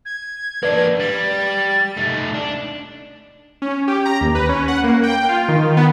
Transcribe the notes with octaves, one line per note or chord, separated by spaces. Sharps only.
G#6
A#3 D4 B4 D5
G3 A6
A3 D#4
D4
C#4
G4
A#5
D#2
B4
C#4
F#5
A#3
G5
F4
D#3
B3